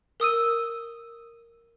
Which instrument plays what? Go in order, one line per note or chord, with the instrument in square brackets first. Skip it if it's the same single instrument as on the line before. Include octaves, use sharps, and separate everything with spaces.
[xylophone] A#4 D#6 E6 D#7